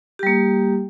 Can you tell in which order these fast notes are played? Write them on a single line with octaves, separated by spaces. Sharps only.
G4 G3 A#3